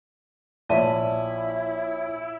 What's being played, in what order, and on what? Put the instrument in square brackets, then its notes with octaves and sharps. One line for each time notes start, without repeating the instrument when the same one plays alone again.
[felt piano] A#1 C#5 B6 [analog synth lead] E4 [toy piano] D5 E5 A5